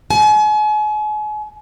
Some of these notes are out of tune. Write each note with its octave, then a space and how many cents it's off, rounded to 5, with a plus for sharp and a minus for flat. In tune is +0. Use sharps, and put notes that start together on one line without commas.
G#5 +40